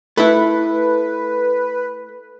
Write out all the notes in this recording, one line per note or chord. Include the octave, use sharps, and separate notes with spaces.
A3 E4 B4